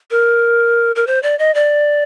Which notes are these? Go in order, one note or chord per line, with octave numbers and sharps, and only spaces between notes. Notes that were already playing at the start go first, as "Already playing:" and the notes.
A#4
A#4
C5
D5
D#5
D5